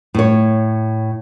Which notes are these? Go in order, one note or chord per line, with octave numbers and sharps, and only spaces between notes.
A2 C#5